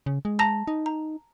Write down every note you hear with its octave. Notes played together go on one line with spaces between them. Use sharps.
C#3
G#3
A5 A#5 A#6
D#4
A#5